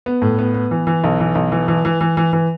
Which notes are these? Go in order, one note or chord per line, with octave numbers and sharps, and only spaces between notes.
B3
A2
B3
B3
E3
E3
B1
E3
B1
E3
E3
E3
E3
E3
E3